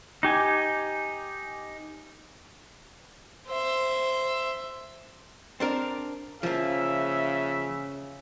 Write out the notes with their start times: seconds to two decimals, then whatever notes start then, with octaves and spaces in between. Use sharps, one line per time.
0.23 D#4 G4 G#5
3.48 C5 E5
5.60 C4 D4 A#4
6.43 C#3 F3 A#3 E5